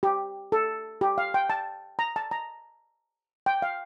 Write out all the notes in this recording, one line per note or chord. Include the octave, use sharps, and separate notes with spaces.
G4
A4
G4
F5
G5
A5
A#5
A5
A#5
G5
F5